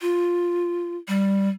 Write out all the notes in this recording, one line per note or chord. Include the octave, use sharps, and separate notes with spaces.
F4
G3